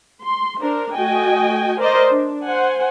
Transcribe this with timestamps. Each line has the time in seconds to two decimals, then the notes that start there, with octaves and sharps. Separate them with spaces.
0.22 C6
0.61 D4 A#4 C5
0.94 A3 F#4 D#5 G5 G#5
1.79 A#4 C5 D5 D#5
2.09 D4
2.44 C5 F#5 G#5